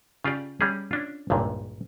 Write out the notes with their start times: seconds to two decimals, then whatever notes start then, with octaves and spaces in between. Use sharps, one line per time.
0.24 C#3 F4 G4 D5
0.61 G3 C#4 G#4
0.91 C#4 D4 F4
1.30 G#1 C#2 G2 A#2